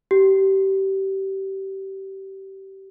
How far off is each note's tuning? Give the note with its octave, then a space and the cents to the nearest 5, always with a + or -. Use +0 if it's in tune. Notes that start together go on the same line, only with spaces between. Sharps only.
G4 -25